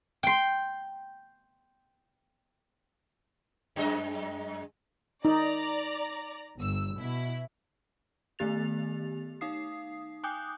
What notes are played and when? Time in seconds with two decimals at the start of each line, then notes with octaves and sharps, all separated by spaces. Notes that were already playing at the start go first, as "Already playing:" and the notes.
0.23 G5 C6
3.76 F#2 G#3 D#5
5.25 D#4 D5 A#5
6.57 G1 E6
6.96 B2 E4
8.39 D#3 A3 B3 G4 A6 F7
9.41 D#4 F5 D#6 C7
10.24 G5 G#5 D6 D#6 F#6 G6